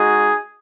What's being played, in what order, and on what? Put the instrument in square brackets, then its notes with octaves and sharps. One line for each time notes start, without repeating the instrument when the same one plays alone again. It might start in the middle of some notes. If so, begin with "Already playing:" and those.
Already playing: [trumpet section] G#3 D#4 F#4 G#4